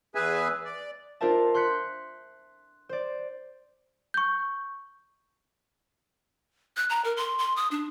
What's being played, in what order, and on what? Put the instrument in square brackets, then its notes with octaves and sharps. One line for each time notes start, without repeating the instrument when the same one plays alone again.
[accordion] E2 G#4 B4 E5 G#5
D5
[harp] D4 F4 A#4 C5 E5 A5
C6 F#6 G6 B6 C#7
C5 D5
[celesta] C#6 G6
[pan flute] F#6
A#5
A#4
C6
C6
D#6
D4